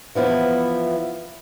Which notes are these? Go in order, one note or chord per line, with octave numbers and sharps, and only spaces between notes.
E3 F3 B3 E4